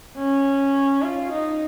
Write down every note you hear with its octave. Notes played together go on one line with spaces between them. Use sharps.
C#4
F4
D#4